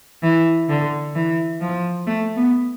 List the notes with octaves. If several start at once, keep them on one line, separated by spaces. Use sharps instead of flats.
E3
D3
E3
F3
A3
B3